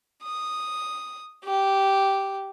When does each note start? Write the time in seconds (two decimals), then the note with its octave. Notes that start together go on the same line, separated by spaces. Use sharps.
0.24 D#6
1.45 G4